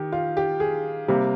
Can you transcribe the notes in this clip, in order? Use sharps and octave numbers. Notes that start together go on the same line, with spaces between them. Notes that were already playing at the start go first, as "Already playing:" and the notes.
Already playing: D#3 G4
F4
G4
G#4
C3 G3 A#3 G4